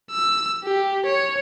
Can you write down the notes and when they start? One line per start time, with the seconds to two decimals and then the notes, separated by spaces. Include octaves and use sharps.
0.11 E6
0.64 G4
1.06 C#5